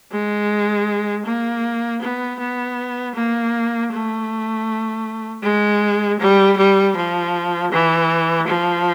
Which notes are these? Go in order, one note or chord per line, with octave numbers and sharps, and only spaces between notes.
G#3
A#3
B3
B3
A#3
A3
G#3
G3
G3
F3
E3
F3